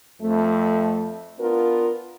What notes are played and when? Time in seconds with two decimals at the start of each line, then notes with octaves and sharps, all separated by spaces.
0.22 F2 A3
1.39 B3 D4 F4 A#4